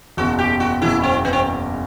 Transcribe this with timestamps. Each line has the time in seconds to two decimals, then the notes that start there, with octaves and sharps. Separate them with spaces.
0.17 F#1 E2 B2 F#4
0.39 G4
0.60 F#4
0.82 F#1 E2 B2 E4
1.03 C4
1.25 B3
1.33 C4